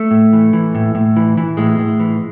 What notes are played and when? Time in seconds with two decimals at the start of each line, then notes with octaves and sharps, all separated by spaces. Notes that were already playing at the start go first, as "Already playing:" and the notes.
Already playing: A3
0.11 A2
0.33 E3
0.53 E3
0.75 A2
0.95 A2
1.16 E3
1.37 E3
1.57 A2 G#3
1.79 A2
2.00 E3